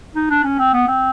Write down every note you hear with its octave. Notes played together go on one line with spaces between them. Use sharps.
D#4
D4
C#4
C4
B3
C4